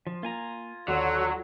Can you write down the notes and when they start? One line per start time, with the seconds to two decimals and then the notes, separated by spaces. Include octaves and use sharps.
0.07 F3
0.23 A#3 F4 G#5 A#5
0.88 D#2 D3 F#3 A4 C#5 D5 C6